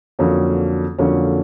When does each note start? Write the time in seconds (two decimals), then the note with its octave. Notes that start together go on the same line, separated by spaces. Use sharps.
0.19 F2 D3 F#3 A#3 C#4
0.99 F2 D3 F#3 A#3 C#4